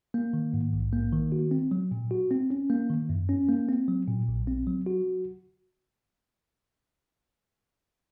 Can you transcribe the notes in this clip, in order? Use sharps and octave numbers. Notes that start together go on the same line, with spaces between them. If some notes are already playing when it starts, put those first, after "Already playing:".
A#3
D#3
G#2
A#1
A#3
D#3
F#4
C4
F#3
A#2
F#4
C4
C#4
A#3
D#3
F#2
C#4
A#3
C4
F#3
A#2
A#1
C4
F#3
F#4